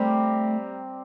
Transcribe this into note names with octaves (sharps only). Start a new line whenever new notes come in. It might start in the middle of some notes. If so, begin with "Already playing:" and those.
Already playing: G3 A3 C4 G4 A#4